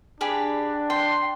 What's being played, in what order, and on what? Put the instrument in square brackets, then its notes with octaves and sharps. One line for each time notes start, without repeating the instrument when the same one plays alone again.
[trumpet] D4 [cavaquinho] G4 G#4 B5
[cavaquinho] G5 [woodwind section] C6